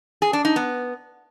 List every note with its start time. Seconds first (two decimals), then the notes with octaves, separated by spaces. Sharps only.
0.22 G#4
0.33 D4
0.45 D#4
0.56 B3